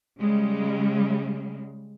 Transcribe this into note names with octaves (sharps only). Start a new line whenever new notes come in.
C#3 G3 G#3